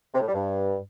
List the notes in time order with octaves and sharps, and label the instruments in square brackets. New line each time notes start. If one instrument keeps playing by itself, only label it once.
[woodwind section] C3
A2
G3
G2